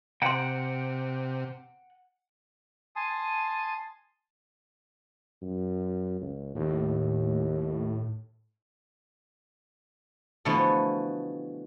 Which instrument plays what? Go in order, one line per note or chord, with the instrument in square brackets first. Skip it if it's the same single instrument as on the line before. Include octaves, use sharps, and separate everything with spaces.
[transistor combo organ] C3 [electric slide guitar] F#5 G5 [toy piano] A#5 C6
[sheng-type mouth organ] G#5 A5 C6 D#6
[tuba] F#2
C#2
[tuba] D#2 [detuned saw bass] A2
[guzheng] B2 D3 E3 F3 A3 B3